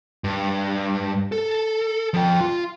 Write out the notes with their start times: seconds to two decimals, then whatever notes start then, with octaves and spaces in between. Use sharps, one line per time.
0.24 G2
1.32 A4
2.14 F3 G5
2.41 F4